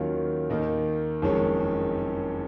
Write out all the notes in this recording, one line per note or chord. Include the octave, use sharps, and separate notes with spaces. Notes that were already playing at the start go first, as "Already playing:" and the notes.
Already playing: D#2 D#3 F#3 C#4 F4
D#2 D#3 A#3 D#4
F#1 F2 D#3 G#3 C#4